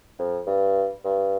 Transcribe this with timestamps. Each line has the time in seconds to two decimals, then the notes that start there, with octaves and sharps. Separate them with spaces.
0.19 F2
0.47 G2
1.05 G2